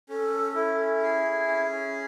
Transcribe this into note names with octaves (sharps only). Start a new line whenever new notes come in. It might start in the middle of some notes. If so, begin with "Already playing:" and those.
C#4 A4
E4
G#4
C#4